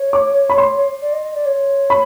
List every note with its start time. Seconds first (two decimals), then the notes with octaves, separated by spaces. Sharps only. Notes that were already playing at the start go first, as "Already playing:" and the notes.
Already playing: C#5
0.13 D6
0.50 B5
0.58 C6
1.02 D5
1.12 D#5
1.23 D#5
1.35 D5
1.45 C#5
1.90 B5